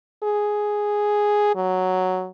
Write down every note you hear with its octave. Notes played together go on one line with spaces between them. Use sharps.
G#4
F#3